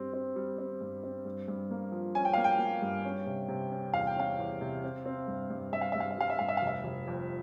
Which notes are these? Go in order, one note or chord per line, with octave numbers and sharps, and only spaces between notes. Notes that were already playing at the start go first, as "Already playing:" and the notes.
Already playing: G2 G3 C4
C4
G3
C4
G2
C4
G2
G2
A#3
F3
C#4 G#5
G5
A#3 F5
G5
A#3
G2
C#4
C3
C3
C#4
E2 F5
G5
C#4 F5
E2
C3
C4
C4
G2
G2
G2 E5
F5
G2 E5
F5
E5
G3 F5
E5
G2 F5
E5
F5
F1
E5
F1
F2